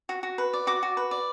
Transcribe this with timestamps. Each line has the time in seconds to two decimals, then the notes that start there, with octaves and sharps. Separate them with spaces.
0.09 F#4
0.23 F#4
0.38 B4
0.53 D5
0.67 F#4 D6
0.83 F#4
0.97 B4
1.11 D5